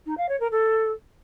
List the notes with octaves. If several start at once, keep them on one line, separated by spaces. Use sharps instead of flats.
D#4
F5
C#5
A#4
A4